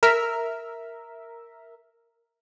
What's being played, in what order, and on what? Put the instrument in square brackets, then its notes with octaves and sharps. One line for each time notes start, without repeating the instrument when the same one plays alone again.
[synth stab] A#4 E5